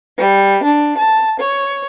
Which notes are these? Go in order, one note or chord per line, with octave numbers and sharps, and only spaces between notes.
G3
D4
A5
C#5